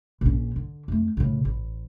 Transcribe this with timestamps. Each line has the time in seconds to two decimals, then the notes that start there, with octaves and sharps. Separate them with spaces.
0.21 A#1 C#4
0.56 D3
0.88 F2 A3
1.17 A2 C#3
1.45 A1